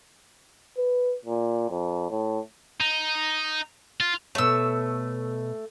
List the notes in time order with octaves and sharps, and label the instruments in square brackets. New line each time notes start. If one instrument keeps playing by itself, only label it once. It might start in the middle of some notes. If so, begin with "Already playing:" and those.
[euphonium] B4
A#2
F2
A2
[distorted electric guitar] D#4
F4
[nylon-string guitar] B2 C#5 [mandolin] A3 E6